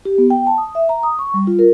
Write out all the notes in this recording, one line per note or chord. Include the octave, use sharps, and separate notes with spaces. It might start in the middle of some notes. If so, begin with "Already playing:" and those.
G4
B3
G5
A5
D#6
E5
A#5
D#6
C#6
G3
F4
A#4